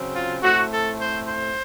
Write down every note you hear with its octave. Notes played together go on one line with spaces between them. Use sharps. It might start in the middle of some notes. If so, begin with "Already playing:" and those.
Already playing: C#3 F#3 C4
F4
A2 A3 C4 F#4
A4
C5
C5